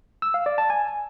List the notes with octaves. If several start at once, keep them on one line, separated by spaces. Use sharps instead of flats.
E6
F5
D5
A5
G#5